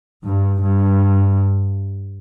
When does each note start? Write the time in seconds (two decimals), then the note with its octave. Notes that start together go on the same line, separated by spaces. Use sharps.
0.24 G2
0.62 G2